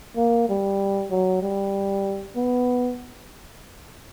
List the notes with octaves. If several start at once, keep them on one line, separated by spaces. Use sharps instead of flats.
A#3
G3
F#3
G3
B3